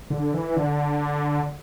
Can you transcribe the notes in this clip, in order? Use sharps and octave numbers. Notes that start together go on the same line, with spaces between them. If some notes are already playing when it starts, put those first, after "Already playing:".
D3
E3
D3